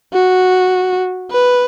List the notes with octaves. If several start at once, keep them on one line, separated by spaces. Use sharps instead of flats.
F#4
B4